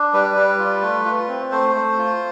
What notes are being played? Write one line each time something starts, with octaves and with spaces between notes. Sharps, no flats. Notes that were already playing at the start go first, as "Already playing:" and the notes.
Already playing: D4
G3 B4
G3
F4
A3
F4
C4
A3 C5
A3
F4